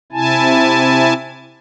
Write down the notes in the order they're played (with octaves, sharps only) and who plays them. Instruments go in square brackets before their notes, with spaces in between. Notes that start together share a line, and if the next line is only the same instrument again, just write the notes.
[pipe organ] C3 E4 G#5 A5